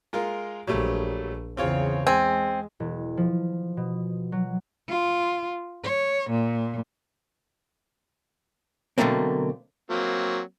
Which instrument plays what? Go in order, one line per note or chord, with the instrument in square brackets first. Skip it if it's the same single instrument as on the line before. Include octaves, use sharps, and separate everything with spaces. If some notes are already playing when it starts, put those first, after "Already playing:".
[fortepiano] G#3 F4 A#4
[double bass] A#1 [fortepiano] F#3 G3 A3
[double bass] E2 C#3 [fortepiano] C4 F4 C#5
[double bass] G#3 [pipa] C4 [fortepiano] G#5
[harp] E1
F3
B2
F#3
[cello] F4
C#5
A#2
[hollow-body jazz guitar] B2 D3 F#3 A3 A#3 C4
[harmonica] F#3 A#3 C4